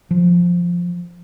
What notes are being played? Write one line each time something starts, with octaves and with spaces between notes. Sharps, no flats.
F3